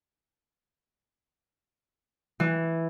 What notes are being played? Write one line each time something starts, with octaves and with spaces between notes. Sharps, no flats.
E3